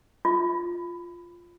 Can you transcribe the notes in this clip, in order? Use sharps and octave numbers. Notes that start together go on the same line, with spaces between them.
F4